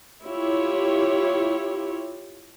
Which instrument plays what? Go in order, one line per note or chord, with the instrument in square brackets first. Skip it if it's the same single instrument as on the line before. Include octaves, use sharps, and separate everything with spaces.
[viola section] E4 F4 G4 C#5